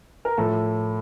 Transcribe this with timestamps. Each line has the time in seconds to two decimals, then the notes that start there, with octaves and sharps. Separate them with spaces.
0.25 A#4
0.37 A2 F3 A4